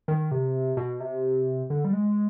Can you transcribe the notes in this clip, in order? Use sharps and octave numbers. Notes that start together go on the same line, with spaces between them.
D#3
C3
B2
C3
D3
G3
G#3